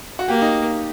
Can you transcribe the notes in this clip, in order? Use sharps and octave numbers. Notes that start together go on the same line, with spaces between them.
F#4
A#3 G4
D#4